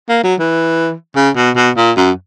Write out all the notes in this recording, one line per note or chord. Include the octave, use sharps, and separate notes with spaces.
A#3
F#3
E3
C#3
B2
B2
A#2
F#2